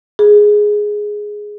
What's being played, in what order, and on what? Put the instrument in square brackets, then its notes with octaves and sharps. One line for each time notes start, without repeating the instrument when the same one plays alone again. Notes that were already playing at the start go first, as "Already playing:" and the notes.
[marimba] G#4